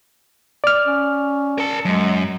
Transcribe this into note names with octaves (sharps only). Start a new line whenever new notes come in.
D5 F6
C#4
A#4 A5
F#2 G#3